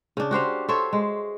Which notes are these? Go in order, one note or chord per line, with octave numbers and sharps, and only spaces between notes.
C#3 D4
F#4 G4 C5 F5
A4 C5 C#5 E5
G#3